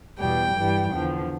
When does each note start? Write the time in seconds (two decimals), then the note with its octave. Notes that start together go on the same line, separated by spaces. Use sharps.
0.18 E2 B2 G3 G5
0.55 G2 E3 G3
0.92 E2 D3 F3